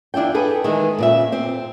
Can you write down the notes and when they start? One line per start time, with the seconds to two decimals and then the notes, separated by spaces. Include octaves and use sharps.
0.14 E2 D4 E4 F4 G5
0.34 G#4 A4 B4
0.64 D#3 E3 G#3
0.98 A#2 C#3 E5
1.32 C4